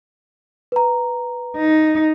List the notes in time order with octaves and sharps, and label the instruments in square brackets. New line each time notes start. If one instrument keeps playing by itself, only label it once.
[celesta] B4 A#5
[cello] D#4